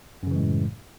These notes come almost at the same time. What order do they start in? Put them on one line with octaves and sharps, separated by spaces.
F#2 C#3 E3 G#3 A2